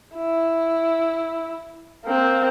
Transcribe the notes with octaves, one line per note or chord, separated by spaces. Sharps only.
E4
A#3 C4